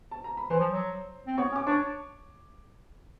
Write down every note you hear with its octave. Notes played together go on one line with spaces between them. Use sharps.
A5
A#5
B5
E3 C5 C6
F3
F#3
C4
B3 C#5 C#6
C#4
D6
D4 C#5 C#6